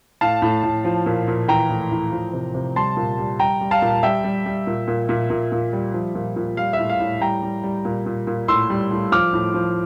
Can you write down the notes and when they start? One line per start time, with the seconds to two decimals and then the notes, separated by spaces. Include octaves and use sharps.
0.21 A2 F5 A5
0.42 A2
0.63 A2
0.85 F3
1.06 A#2
1.28 A#2
1.48 E3 G5 A#5
1.70 A2
1.91 A2
2.12 F3
2.33 C3
2.54 C3
2.76 G3 A5 C6
2.97 A#2
3.18 G3
3.39 G3 G5 A#5
3.61 G3
3.71 F5 A5
3.82 A#2
4.03 G3 E5 G5
4.24 G3
4.46 G3
4.67 A#2
4.88 A#2
5.09 A#2
5.30 A#2
5.52 A#2
5.73 G3
5.94 F3
6.15 A#2
6.36 A#2
6.57 G3 F5
6.73 E5
6.79 A2
6.90 F5
7.00 A2
7.21 G3 G5 A#5
7.43 G3
7.63 G3
7.85 A#2
8.06 A#2
8.27 A#2
8.48 A2 C6 E6
8.70 G3
8.91 A2
9.12 F3 D6 F6
9.33 A2
9.54 F3